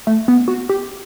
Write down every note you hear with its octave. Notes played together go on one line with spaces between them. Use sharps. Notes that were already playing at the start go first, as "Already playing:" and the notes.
A3
B3
F#4
G4